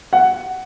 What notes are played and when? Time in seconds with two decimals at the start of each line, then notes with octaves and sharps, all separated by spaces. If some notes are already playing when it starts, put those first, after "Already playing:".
0.13 F#5